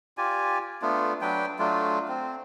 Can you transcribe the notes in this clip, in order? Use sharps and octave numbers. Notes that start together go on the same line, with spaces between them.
F4 G4 D5 G#5
A3 B3 D4 F4
F#3 D4 B4 G5
F#3 A3 D4 F4
C4